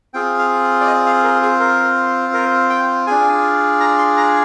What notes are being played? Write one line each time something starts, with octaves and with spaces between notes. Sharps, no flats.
C4 F4 G#4 G5
F5
D5
D#5
F5
A#4
G#4
A#4
A#4
G5
D4 F4 G#4 G#5
A#5
C6
A#5